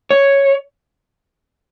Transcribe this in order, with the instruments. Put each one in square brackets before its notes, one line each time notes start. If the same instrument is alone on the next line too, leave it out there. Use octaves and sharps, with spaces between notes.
[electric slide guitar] C#5